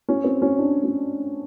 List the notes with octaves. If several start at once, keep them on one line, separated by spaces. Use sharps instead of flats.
C#4
C4
C#4
D4
C#4